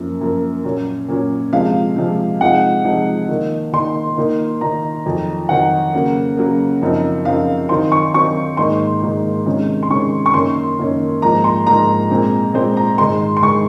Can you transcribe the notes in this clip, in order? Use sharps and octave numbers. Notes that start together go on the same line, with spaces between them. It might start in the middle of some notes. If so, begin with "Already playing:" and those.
Already playing: F#2 F3 A#3
F#2 F3 A#3
A#2 F#3 C#4
A#2 F#3 C#4
C3 F3 G#3 F5
C3 F3 G#3
C3 F3 G#3 D#4 F#5
C3 F3 G#3 D#4
D#3 A#3 D#4
D#3 A#3 D#4 C6
D#3 A#3 D#4
D#3 A#3 D#4 A#5
F2 D#3 F#3
F2 D#3 F#3 F#5
C#3 F#3 A#3
C#3 F#3 A#3
F#2 C#3 F3 C4 D#4
F#2 C#3 F3 C4 D#4 F5
D#3 F#3 C4 D#4 C6
C#6
D#3 F#3 C4 D#4 C#6
G#2 D#3 A#3 D#4 C6
G#2 D#3 A#3 D#4
C3 D#3 G#3 C#4
C6
C3 D#3 G#3 C#4 C#6
C#6
F#2 D#3 A#3 C#4 C6
F#2 D#3 A#3 C#4
G#2 F3 A#3 D#4 A#5
C6
G#2 F3 A#3 D#4 A#5
A#2 G#3 C4
A#2 G#3 C4 C5
A#5
G#2 D#3 G#3 C6
C6
D#3 G#3 C#6